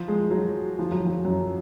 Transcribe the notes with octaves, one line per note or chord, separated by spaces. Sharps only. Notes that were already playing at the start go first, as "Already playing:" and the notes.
Already playing: F3
G#3
F#3
F3
F#3
F3
F#2